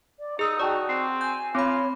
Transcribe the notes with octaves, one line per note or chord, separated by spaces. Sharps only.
D5
D#4 G#4 D#6 E6
F#4 D5 G5 A5 C#6
C4 C7
G#5 G6
C4 F4 C#5 B5 D6